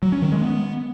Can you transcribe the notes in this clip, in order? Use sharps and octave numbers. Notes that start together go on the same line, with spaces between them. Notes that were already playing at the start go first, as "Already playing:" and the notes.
F#3
C#4
D#3
G#3
B3